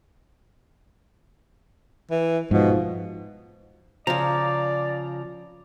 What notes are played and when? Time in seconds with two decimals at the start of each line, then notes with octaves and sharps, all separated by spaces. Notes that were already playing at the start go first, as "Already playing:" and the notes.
2.11 E3
2.51 G#2 B2 F3
4.07 C#3 F3 D5 A#5